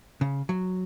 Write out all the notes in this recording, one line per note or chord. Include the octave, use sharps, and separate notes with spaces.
C#3
F#3